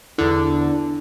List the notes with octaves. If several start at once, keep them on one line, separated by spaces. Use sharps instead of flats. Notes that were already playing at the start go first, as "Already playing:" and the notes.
E2 D3 E4